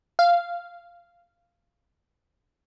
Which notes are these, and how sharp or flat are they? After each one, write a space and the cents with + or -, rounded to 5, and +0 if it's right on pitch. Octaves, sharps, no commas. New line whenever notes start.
F5 -10